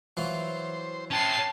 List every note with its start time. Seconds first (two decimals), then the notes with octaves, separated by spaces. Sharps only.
0.17 E3 F#3 F4 C5
1.11 C#4 G4 A5 C7